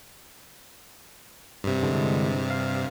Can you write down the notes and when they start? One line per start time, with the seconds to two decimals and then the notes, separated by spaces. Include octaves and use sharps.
1.64 G2 C3
1.83 D3 E3 G#3
2.50 F5